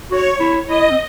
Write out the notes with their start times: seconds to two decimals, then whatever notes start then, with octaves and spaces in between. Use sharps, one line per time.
0.11 F#4 C#5
0.40 E4
0.67 E4 D#5
0.91 C4